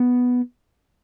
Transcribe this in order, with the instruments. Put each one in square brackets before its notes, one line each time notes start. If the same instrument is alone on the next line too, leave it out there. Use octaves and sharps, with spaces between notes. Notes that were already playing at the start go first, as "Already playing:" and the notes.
Already playing: [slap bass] B3